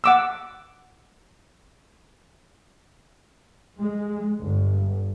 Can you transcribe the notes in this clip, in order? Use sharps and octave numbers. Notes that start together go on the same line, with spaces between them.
F#5 D6 E6
G#3
G1